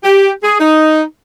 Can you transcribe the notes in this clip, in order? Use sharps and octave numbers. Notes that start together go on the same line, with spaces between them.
G4
G#4
D#4